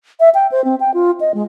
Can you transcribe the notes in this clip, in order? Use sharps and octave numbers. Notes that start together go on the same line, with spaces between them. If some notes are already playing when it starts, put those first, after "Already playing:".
E5
G5
C5
C4
G5
F4
D#5
G#3